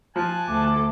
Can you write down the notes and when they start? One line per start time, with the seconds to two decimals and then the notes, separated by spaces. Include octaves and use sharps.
0.16 F3 G#5 A5 F#6
0.48 D2 A4 D6